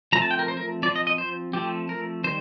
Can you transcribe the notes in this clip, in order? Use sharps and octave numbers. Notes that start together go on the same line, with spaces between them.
F3 A3 C4 A#5
A5
G5
A#4
C5
A#4
F3 C4 D5
D#5
D#5
C5
F3 A3 C4 G4
A#4
D#3 G3 C5